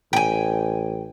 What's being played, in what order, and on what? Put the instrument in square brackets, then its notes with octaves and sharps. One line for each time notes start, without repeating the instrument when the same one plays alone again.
[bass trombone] A1 [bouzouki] G5 G#5